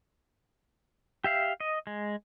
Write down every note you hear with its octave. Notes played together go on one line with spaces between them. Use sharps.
G4 E5 F5
D#5
G#3